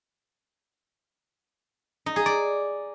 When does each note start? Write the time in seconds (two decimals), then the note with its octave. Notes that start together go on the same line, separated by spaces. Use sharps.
2.06 D#4
2.16 G#4
2.26 D5